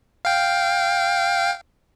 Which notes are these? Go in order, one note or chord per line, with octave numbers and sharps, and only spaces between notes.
F5 G5